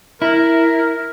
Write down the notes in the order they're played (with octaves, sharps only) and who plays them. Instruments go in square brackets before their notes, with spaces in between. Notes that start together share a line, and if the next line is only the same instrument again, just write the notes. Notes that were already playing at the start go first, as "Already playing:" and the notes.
[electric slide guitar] E4 [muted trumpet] A#4